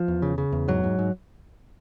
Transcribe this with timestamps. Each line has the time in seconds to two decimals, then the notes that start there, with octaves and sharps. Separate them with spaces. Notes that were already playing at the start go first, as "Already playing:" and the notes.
Already playing: F3
0.08 E2
0.22 C#3
0.38 C#3
0.52 E2
0.68 G#2 F#3
0.84 G#2
0.99 G#2